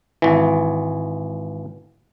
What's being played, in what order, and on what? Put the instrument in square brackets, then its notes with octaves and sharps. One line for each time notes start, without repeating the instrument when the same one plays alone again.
[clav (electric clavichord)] G#1 E3